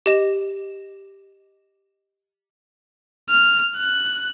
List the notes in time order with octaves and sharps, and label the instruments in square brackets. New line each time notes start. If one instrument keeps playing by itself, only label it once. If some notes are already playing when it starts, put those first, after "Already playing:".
[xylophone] G4 D#5 E7
[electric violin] F6
F#6